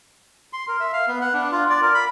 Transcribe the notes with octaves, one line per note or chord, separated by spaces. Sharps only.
C6
A#4
E5
F5
B3
F#5
D4
F4
D5
A#4
B5